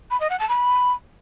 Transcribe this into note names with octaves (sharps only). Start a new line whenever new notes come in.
B5
D#5
F#5
A5
B5